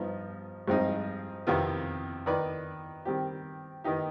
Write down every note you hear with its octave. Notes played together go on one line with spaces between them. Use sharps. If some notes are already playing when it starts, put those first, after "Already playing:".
Already playing: G2 F3 B3 D#4
G2 F3 G#3 C4 D#4
F2 C3 D#3 B3 F4
D#3 B3 D#4 B4 D5
D#3 G3 C4 G4
D#3 B3 D#4 G4